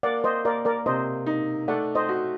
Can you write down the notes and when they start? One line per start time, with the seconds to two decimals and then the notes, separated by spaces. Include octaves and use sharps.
0.03 A#3 D5 F#5
0.24 C5 D#5
0.45 A#3 A#4 D5
0.65 A#4 D5
0.86 C3 C5 D#5
1.26 D#4
1.68 A3 D5 F#5
1.95 C5 D#5
2.09 F#4